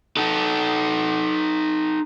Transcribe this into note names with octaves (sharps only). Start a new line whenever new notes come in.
D#4 A4